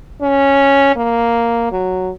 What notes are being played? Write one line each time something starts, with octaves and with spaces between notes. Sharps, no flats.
C#4
A#3
F#3